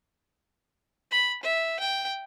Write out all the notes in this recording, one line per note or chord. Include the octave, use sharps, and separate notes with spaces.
B5
E5
G5